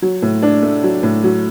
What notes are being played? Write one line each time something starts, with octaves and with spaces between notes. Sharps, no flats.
F#3
A2
D4
A3
F#3
A2
F#3